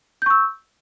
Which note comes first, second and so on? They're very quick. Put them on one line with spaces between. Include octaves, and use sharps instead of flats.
G6 C#6 E6